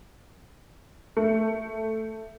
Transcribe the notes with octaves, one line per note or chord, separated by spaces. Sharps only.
A3